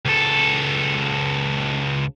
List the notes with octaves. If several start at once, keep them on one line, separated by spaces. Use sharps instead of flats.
C#2 A4